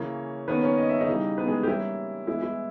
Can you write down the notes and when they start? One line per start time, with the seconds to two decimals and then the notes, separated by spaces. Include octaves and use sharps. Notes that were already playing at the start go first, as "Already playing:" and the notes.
Already playing: C#3 E3 A#3 C#4 C#5
0.48 D#3 A#3 B3 C#4 B4
0.63 C#4 C#5
0.78 D#5
0.89 E5
1.01 D#4 D#5
1.08 C#3 E3 G3
1.38 B3 B4
1.47 G#3 G#4
1.63 G4
1.67 E3 G3 A#3 C#4 E4
2.27 E3 G#3 B3 E4
2.42 E4